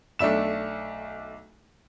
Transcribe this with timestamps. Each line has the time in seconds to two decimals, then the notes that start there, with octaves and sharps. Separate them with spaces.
0.19 B1 A3 D4 E5 E7